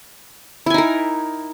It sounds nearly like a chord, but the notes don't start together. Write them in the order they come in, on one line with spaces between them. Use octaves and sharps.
E4 G#5 D#4 A#4